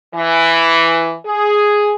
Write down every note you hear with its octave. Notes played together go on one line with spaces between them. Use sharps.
E3
G#4